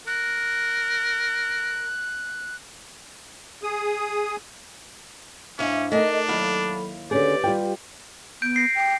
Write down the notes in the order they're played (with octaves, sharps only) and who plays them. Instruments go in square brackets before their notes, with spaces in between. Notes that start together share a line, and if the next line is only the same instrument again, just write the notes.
[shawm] A#4 [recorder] F#6
[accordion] G#4 D#6
[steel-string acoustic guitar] G#2 E4 [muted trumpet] C#4 [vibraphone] D4 E5 F5
[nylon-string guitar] A3 D#4 [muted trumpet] D4 [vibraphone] A4 A#4 [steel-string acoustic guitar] D#5 G#5
[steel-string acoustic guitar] D#2 E4 F5 [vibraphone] F#3 A4 B5
[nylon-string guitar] D3 C#4 G#4 [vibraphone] G4 B4 [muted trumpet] D5
[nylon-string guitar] G3 F4 G5
[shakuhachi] B3 [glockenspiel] G6 D7
[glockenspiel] A#6 C7
[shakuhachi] G5